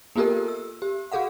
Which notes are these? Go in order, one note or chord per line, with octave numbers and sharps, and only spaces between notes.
A#3 B3 F4 G4 A4 A#4
E6
G4
F#4 G#4 A4 F5 F#5